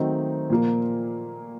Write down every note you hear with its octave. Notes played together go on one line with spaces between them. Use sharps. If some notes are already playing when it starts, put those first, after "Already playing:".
Already playing: D#3 F#3 A3 C4 D#4
A#2 F3 A#3